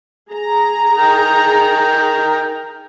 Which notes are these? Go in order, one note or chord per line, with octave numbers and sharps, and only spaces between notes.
G#4 A#5
D#4 A#4 G5